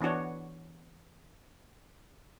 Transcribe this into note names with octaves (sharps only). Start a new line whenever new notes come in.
E3 B3 D4 F#4 C#5